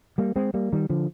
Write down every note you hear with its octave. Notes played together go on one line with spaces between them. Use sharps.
G3 A#3
G#3 C4
G3 A#3
D#3 G3
D3 F3